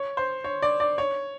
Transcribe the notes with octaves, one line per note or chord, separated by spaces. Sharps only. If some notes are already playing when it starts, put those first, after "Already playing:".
Already playing: C#5
C5
C#5
D5
D5
C#5